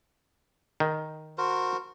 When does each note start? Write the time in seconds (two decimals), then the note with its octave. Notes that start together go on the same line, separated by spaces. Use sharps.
0.80 D#3
1.38 F#4 A#4 C5